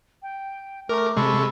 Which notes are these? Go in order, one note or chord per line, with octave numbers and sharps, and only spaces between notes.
G5
A3 A#4 D6
C3 G#3 A4 B5 C#6